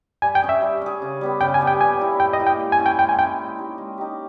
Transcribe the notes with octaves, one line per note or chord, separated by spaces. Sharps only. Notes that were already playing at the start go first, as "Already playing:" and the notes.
G3 G#5
G5
C#4 G#4
E5
G3
C#4 G#4
C#3
G3 B3 G4
C#3 G5
G#5
G3 B3 G4
G5
A#2 G#5
A#3 E4 G4
A#2 G5
D#5
A#3 E4 G4
G5
G#3
G#5
C#4 E4
G5
G#3 G5
G#5
C#4 E4 G5
G#3
D#4 G4
G#3
D#4 G4